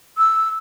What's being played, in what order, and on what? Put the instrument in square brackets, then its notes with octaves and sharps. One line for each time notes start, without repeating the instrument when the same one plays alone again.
[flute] E6